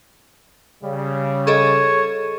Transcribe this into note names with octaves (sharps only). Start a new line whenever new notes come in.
C#3 G3
G#4 A4 C#5 D#5